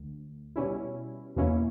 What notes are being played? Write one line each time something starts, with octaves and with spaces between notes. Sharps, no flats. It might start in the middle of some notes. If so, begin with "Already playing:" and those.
Already playing: D2
B2 G3 C#4 E4
E2 B2 A#3 C#4 E4